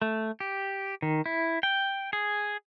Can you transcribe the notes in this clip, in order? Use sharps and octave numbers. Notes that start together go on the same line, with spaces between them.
A3
G4
D#3
E4
G5
G#4